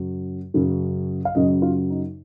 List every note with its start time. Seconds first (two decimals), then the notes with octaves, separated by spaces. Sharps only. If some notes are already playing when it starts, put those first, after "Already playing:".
Already playing: F#2 C#3 F#3
0.54 F#2 C#3 F#3
1.25 F5
1.35 F#2 C#3 F#3 D#5
1.62 F4
1.90 D#4